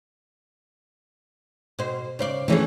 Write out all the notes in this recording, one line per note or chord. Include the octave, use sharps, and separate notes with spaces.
B2 C5
C#3 C5 D5
D3 E3 A3 C#4 G#4